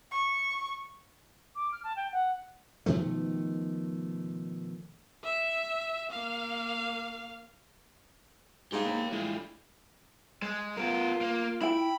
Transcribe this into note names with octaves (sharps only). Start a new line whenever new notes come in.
C#6
D6
F6
A5
G5
F#5
B2 D#3 F3 A3
E5
A#3 F5
G#2 G3 G#3 D4 G4 F5
A#3 C#5
A2 E3 G3 G#3 D4 F4
G#3
B3 F4 A#4
A#3
E4 G5 B5